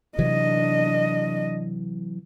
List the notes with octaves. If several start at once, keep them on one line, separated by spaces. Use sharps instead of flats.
C3 E3 F#3 D4 D#5